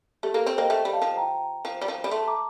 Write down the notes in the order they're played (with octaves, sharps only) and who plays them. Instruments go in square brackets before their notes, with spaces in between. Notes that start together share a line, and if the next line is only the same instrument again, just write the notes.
[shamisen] A3 [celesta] G4
[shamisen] A#3 [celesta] A4
[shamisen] C4 [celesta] C5
[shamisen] A#3 [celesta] D#5 G5
[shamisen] A3
G3
[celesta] F5 A5
[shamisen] F3
[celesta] G5 A#5
[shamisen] F3
G3
F3
G3
[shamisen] A3 [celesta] A5 C6
[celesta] A#5 D6